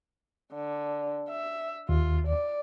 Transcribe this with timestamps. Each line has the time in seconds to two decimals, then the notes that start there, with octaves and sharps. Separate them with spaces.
0.54 D3
1.29 E5
1.89 D#2 F4
2.27 D5